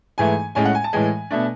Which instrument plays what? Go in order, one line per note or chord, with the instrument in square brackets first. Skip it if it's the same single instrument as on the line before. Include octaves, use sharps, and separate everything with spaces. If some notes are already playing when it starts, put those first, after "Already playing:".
[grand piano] G#2 E3 A3 G#5
A2 G#3 C#4 G#5
F#5
G#5
A5
A2 E3 G#3 G#5
B2 A3 D4